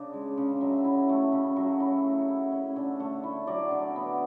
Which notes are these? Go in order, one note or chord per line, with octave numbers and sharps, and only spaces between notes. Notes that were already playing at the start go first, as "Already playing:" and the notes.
Already playing: C#3 D4 D5
G#3
C#3
F#3 E5
E4
A3
C#3
F#3
E4
A3
E4
C#4
D3
A3
E4
F#3 D5
D3
B3